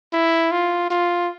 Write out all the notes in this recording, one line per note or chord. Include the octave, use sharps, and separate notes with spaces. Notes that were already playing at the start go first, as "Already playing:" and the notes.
E4
F4
F4